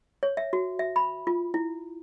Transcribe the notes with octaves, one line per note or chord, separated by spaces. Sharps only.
C#5
E5
F#4
E5
B5
F4
E4